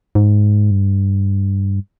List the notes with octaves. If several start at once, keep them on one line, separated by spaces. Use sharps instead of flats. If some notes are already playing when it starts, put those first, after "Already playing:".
G#2
G2